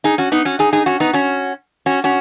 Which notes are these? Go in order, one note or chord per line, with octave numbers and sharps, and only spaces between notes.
D#4 G#4
C#4 F#4
B3 D#4
C#4 F#4
D#4 G#4
D#4 G#4
C#4 F#4
B3 D#4
C#4 F#4
C#4 F#4
C#4 F#4